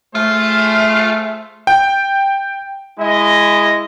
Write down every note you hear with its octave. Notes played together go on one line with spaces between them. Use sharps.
A3 F4 G#4 C5 E5
G5
G#3 E4 D#5